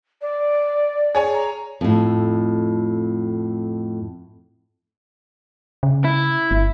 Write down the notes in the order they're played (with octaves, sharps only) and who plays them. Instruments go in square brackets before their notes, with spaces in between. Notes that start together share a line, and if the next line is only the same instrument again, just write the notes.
[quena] D5
[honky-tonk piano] G#4 C#5 G#5
[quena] A#5
[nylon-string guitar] F2 A2
[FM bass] C#3
[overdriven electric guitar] E4
[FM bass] G1